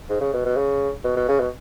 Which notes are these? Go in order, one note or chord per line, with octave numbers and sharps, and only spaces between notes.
G#2
C#3
B2
B2
C#3
B2
B2
C#3
B2